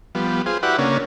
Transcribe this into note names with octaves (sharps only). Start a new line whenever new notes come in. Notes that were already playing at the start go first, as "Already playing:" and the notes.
F3 G3 B3
F4 G#4 C5
E4 F#4 G4 B4 D5 F#5
C#3 A#3 C#4 D4